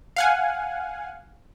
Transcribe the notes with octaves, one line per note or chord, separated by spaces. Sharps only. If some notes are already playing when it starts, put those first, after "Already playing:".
F5 F#5 G#5